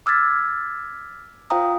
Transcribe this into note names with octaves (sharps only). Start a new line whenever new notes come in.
D6 E6 F6 G#6 A6 B6
F4 C5 F5 G5 A#5 D#6